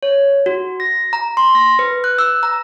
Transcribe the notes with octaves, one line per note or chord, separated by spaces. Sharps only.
C#5
F#4
A#6
A#5
C6
A#6
B4
F#6
E6
A#5